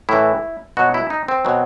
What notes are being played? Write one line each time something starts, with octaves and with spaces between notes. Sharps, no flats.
A2 E3 E4
B2 F#3 F#4
E4
D#4
C4
B2 F#3